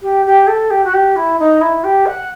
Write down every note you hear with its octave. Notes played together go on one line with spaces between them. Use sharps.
G4
G4
A4
G4
F#4
G4
E4
D#4
E4
G4
F#5